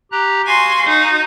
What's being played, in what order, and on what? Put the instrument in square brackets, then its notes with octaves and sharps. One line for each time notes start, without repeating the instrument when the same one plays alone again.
[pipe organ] G4 A#5 F#6
[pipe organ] F#4 F5 [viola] G#5 C6
[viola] D#4